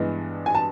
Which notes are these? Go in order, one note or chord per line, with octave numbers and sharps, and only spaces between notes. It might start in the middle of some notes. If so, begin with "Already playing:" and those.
Already playing: G2 E3 G#3 B3 D4
G#5
A5